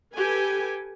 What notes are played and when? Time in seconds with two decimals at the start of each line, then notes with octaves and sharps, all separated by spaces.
0.14 G4 A4 B4 G#5